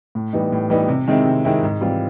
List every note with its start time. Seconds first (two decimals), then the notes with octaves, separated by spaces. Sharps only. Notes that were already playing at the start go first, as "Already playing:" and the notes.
0.15 A2
0.33 E3 G3 B3 D#4
0.52 A2
0.70 E3 G3 B3 D#4
0.88 C3
1.08 D#3 G#3 C4 E4
1.25 C3
1.45 D#3 G#3 C4 E4
1.63 G#2
1.81 E3 G3 C4 F4